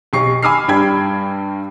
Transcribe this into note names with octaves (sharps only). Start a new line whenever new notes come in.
B1 G4 C#6 C7
G#5 B5 D6 E6 F6 C7
G2 G3 G5 B5 G#6